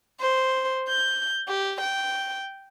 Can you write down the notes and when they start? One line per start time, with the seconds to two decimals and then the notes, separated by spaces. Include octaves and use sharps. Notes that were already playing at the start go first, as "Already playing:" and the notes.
0.20 C5
0.88 G6
1.48 G4
1.81 G5